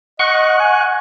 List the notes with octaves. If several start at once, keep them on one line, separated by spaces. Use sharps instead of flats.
D#5 F#5 C#6 F#6
G#5